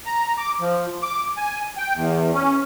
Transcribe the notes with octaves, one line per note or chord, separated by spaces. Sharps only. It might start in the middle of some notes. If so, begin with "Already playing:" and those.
A#5
D6
F3
D6
G#5
G5
E2
C#4